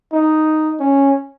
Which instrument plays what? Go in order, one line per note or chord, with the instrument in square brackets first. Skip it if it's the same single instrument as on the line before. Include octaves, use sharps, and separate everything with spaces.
[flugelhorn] D#4
C#4